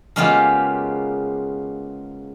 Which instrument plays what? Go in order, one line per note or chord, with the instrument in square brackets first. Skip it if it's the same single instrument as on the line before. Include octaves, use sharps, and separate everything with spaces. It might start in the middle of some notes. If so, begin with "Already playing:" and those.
[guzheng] C#3 G#3 A#3 B3 F4 G4